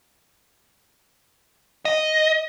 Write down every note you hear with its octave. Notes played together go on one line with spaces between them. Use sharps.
D#5